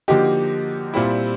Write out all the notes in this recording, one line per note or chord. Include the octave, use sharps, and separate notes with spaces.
D3 F3 A#3 D#4 F#4 G4
A#2 G3 C4 E4